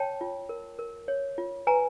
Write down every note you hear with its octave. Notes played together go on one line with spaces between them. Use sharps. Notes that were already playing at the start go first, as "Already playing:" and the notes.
Already playing: C#5 G5 A5
F4
A#4
A#4
C#5
F4
B4 G#5 A#5